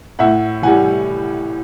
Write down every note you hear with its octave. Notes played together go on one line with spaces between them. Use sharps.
A2 E5 F#5
E3 G3 F#5 G#5